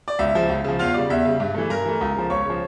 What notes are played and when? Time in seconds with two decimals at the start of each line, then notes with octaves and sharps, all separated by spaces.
0.08 D5
0.19 C#2 E5
0.35 C#3 F3
0.49 C#2
0.64 C#3 F3
0.79 E2 F4 F5
0.94 C#3 G3 D5
1.10 E2 E5
1.25 C#3 G3
1.40 G2
1.55 E3 A3
1.70 G2 A#4 A#5
1.85 E3 A3
2.01 C#2
2.16 C#3 F3
2.30 C#2 C#5 C#6
2.45 C#3
2.50 F3